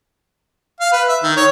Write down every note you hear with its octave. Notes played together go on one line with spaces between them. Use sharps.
F5
B4
E5
D#3
C#5